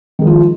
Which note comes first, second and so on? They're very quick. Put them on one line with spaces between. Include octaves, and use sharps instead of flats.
D#3 G#3 F3 F4